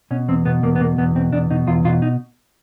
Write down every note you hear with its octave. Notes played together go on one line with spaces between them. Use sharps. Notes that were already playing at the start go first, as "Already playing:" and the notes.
B2 C#4
E2 C4
B2 B3
E2 A#3
B3
B2 A#3
E2 B3
B2 C4
E2 D4
B2 D#4
E2 F4
B2 F4
D#4